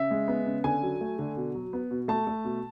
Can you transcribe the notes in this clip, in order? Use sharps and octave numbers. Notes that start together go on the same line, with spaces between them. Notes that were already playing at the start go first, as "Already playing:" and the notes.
Already playing: C#3 E5
G#3
B3
C#3
D3 G#5
F#3
A3
D3
B2
F#3
B3
B2
A3 A5
A3
B2